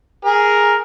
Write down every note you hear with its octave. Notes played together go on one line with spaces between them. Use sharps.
G#4 A#4